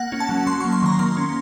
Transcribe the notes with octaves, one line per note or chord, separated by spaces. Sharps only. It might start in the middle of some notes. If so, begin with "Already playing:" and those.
Already playing: A#3 F#5
C#4
A5
F#3
F#3 C6
A#3 C#6
C6
D#3 A#5
A#3 C6
C#4